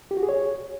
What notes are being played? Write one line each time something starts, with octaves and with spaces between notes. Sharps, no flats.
G4
F#4
G#4
C#5